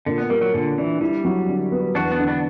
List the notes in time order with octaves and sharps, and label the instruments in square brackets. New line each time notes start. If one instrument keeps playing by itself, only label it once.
[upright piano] A#2 [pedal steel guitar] D3
[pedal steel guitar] B3
[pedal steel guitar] G3 [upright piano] A#3
[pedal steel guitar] F#3
[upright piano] A#2 [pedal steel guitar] D3
[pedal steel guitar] E3 [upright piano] D4
[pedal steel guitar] G3 [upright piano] E4
[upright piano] F#3
D3
B3
[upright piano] E2 [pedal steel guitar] D4 F#4
[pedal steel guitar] B3 D4
[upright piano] D3
[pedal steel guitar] B3 D4